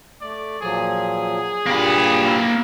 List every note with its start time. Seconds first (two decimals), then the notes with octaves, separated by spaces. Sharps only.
0.21 A3 D5
0.61 A#2 F3 F#3 G#4
1.67 G2 A#2 A#3 G4 B5
2.26 E4